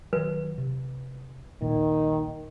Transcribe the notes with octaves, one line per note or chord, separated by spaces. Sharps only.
D#3 F#3 B4
C3
D#1 A#1 A#2 D#3